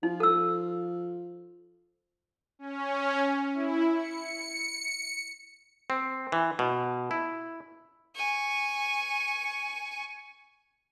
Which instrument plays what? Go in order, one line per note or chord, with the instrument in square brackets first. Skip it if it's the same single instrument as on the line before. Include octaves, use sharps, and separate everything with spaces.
[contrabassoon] F3 [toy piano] D#4
[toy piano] A4 E6
[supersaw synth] C#4
E4
C#7
[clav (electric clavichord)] C4
E3
B2
E4
[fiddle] G#5 C#6